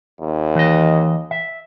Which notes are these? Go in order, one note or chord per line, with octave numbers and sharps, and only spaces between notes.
D#2
E3 D#5
E5